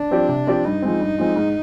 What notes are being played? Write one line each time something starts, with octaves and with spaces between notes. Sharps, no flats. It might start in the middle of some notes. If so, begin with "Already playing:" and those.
Already playing: D4
F3 C4 G4 D5
C3
F3 C4 G4 D5
G2 D#4
F3 G#3 C4
G2
F3 G#3 C4
G#2